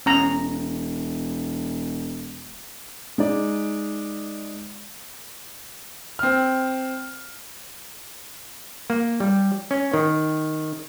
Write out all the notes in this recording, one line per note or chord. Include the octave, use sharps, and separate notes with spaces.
E1 C#4 A#5
G#3 D#4 D5
C4 F6
A#3
G3
C#4
D#3